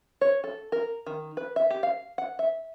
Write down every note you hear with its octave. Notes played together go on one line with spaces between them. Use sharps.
C#5
A4
A#4
D#3
B4
E5
G4
F5
F#5
E5